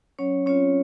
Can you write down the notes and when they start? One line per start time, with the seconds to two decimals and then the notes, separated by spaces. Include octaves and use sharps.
0.19 F#3 C#4 C#5
0.46 C4 C#4 F4 C#5